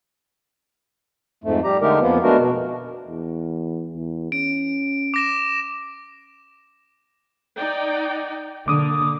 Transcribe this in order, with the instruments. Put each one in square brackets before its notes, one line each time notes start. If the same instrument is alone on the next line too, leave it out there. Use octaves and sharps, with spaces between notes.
[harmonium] F2 G#2 A3
G3 G4 A#5
D3 G#3 A3 D#4 G4 A#4
F2 F3 A#3 B3
G#3 A3 B3 D4 F#4 A#4
B2
[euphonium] E2
E2
[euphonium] C#4 [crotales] D7
[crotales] D6 A#6 E7
[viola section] D#4 D5 G5
[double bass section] D3 [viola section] A#3 [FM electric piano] D6 D#6